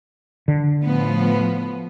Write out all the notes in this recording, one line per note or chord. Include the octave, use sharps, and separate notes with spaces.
D3
A2 F3 B3